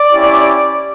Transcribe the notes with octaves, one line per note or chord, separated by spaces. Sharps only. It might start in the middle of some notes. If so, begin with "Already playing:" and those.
Already playing: D5
C#4 E4 G4